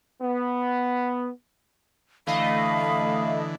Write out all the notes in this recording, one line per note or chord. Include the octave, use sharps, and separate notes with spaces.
B3
D3 E3 A3 D#5 F5 B5